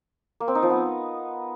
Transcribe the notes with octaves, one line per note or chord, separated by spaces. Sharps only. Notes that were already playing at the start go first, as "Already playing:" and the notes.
A#3
C4
D#4
F3
B3